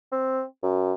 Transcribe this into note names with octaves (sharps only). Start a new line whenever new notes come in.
C4
F#2